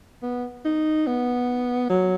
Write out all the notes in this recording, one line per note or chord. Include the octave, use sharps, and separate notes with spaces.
B3
D#4
B3
F#3